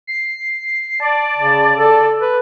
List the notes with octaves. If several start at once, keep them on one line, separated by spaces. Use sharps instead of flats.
C7
D5 A5
C#3
A4
B4